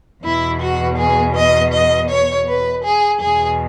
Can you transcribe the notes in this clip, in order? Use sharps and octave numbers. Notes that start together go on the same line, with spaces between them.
E2 B2 E4
F#4
G#4
D#5
D#5
C#5
B4
G#4
E2 B2 G#4